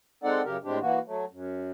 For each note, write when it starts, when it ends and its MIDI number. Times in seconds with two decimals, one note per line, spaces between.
0.24 0.42 56
0.24 0.42 60
0.24 0.42 63
0.24 0.42 69
0.24 0.42 74
0.24 0.42 78
0.45 0.57 42
0.45 0.57 49
0.45 0.57 67
0.45 0.57 70
0.64 0.79 45
0.64 0.79 56
0.64 0.79 60
0.64 0.79 62
0.64 0.79 67
0.81 0.99 52
0.81 0.99 58
0.81 0.99 66
1.06 1.25 54
1.06 1.25 57
1.31 1.72 42